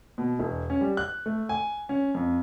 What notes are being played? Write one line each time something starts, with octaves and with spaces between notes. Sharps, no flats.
B2
E1
C#4
G3
F#6
A3
G#5
C#4
F2